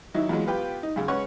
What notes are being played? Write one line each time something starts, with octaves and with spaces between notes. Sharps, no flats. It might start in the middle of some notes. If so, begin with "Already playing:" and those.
D#3 F#3 D#4 E4
E2 A#2 E3 F#3 G#3
B3 F4 G4 B4 G5
D#4
F#2 C#3
G#3 C#4 B4 C#5 F#5 C#6